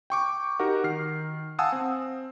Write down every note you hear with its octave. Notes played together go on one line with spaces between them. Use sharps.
G5 C#6 D6
D#4 F#4 G4 A#4 F#5
D#3 F6 C7
F5 F#5 G#5 A5 D#6 E6
C4